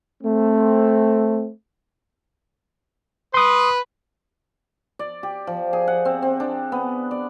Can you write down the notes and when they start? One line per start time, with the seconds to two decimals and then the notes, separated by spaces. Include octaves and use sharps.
0.23 A3 C4
3.34 B4 C6 D#6
4.99 D5
5.23 G4
5.47 F3
5.73 G#4
5.88 F#5
6.05 C4
6.22 C4
6.40 D4
6.72 B3
7.11 D5